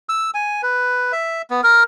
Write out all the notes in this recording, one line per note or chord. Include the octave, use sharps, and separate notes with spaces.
E6
G#5
B4
E5
B3
A#4